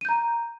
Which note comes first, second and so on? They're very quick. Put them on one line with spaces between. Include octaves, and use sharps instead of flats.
D#7 G6 A#5